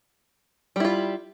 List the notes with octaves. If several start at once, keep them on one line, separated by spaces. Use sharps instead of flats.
G3 E4 F4